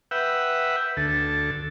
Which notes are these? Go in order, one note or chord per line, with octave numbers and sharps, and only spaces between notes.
B4 E5 F#5 G5
D2 A4